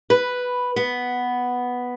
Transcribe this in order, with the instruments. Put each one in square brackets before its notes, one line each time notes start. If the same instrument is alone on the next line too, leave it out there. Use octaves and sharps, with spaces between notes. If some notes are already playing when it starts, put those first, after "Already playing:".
[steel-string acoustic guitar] B4
B3